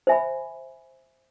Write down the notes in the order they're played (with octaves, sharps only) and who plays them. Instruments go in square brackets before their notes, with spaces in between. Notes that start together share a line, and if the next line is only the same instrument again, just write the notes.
[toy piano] C5 E5 G#5 B5